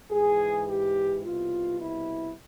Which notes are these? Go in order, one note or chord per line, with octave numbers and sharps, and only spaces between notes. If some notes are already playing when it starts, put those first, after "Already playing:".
G#2 E3 G#4
G4
C2 B2 F4
E4